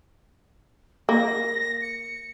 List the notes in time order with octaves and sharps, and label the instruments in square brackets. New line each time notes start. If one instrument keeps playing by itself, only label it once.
[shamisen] A#3 [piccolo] A#6
[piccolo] C#7